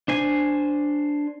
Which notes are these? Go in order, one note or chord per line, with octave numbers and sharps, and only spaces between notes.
D4 C5 G#5